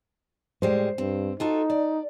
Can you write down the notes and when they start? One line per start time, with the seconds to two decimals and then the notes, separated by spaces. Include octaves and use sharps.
0.62 A2 G3 G#3 C5
0.98 G2 C4
1.40 D#4 F4 F#4 A4
1.70 D5